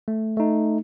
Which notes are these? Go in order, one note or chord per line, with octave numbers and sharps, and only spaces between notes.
A3
A3 D#4